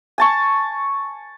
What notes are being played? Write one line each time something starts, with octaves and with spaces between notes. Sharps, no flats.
G#5 A5 C#6